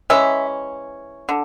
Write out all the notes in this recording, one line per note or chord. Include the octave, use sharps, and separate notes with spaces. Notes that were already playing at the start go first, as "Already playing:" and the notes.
E3 G#3 C#4 E5
D3